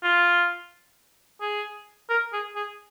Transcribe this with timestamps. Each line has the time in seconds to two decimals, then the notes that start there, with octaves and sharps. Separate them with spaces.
0.03 F4
1.41 G#4
2.10 A#4
2.33 G#4
2.55 G#4